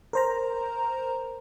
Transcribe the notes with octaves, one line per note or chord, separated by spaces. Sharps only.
A#4 C5 A#5